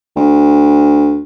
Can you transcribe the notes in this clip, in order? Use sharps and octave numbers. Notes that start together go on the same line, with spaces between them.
D2